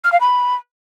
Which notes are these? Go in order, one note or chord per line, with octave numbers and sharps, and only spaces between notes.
F6
F5
B5